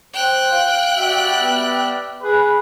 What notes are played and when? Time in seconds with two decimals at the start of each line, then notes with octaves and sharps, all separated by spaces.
0.14 C5 G5 F#6
0.51 F5
0.98 G3 F#4 D5 E5
1.35 B3
2.22 G#4 B4